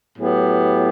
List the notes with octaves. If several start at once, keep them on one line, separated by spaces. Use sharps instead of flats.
A2 F#3 B3 E4 G4